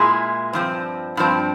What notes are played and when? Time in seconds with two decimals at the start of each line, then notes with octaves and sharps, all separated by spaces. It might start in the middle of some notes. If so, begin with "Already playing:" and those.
Already playing: A#2 G#3 E4 G#4
0.53 G2 F3 C4
1.17 G2 F3 C4